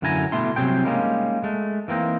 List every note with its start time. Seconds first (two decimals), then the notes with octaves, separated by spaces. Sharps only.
0.02 F#2 A2 D3 E4 G#5 A#5
0.32 B2 G3 A3 D4 E4 C6
0.56 C2 C3 F#3 G#4 C5 G5
0.85 G3 G#3 A#3 C#4 D#4
1.44 G#3 A3
1.88 E3 A#3 C4 D#4